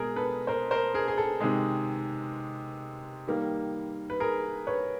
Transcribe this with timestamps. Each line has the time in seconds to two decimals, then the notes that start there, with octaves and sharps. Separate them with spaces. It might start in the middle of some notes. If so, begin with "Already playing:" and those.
Already playing: B2 G#3 G#4 A#4
0.16 A4 B4
0.47 A#4 C5
0.71 A#4 C5
0.94 G#4 A#4
1.08 G#4
1.18 A4
1.41 C3 D#3 G#3 G#4
3.28 D#3 G3 A#3
4.10 B4
4.20 G#4 A#4
4.67 B4 C#5